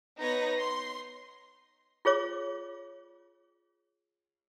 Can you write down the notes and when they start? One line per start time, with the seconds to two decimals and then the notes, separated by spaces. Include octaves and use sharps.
0.19 B3 D#4 B4 C#5 A#6
0.60 C6
2.05 F4 G#4 C#5 D6